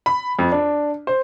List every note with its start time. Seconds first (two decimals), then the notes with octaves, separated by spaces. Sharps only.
0.06 B5
0.39 F2
0.52 D4
1.07 C5